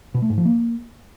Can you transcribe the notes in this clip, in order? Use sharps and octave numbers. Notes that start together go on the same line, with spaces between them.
B2
A3
G#2
F3
A#3